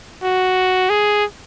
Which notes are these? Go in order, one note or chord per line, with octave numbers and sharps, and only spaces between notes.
F#4
G#4